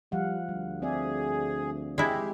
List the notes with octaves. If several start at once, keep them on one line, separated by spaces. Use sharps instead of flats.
F3 G3 F5 F#5
D2 G3
C4 G#4 D5 E5
G#3 E4 G4